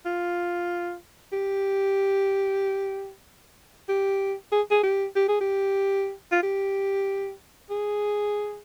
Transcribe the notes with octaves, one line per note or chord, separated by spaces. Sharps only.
F4
G4
G4
G#4
G#4
G4
G4
G#4
G4
F4
G4
G#4